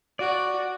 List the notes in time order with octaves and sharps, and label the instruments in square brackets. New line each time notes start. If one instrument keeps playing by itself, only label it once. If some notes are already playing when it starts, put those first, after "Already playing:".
[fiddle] F#4 [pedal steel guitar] D5